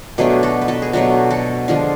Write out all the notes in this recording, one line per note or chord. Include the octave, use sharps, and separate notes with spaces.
B2 F#3 A3 D4 G#4 B4
F#4 A4
B4
F#4 A4
G#4
B2 F#3 A3 D4 F#4
F#4 A4
D3 F3 G#3 D4 F4 G#4